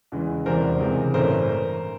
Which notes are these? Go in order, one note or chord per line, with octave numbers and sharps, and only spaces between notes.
E2 C#3 E3 G#3
E1 E2 C3 E3 G3 A#4 C5
C#2 C3 E3 G#3
A1 G2 E3 A3 A#4 C5